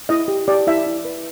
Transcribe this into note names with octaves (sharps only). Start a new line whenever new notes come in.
E4 D#5
G4
G4 D5
E4 E5
E4
B4